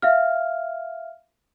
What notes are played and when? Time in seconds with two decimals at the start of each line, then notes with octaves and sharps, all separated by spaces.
0.02 E5 F5 F6